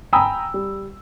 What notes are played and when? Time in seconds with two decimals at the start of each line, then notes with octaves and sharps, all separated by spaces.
0.13 G5 G#5 A#5 B5 D#6 E6
0.54 G3